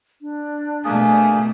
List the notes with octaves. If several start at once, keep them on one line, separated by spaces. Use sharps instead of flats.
D4
B2 A3 A#3 G#4 G#5